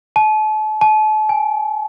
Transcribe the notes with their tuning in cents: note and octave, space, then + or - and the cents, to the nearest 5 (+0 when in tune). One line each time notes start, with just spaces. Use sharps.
A5 -40
A5 -40
G#5 -10